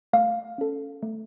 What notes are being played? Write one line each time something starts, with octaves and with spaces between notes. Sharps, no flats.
A3 F5
C#4 A4
A3